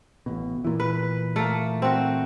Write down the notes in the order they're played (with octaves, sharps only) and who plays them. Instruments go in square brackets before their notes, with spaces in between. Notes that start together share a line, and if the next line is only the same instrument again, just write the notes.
[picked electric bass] A1 B2
A#2 E3
[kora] B4
A3 A#3
C4 F#4